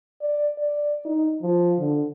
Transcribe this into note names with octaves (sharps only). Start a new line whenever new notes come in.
D5
D5
D#4
F3
D3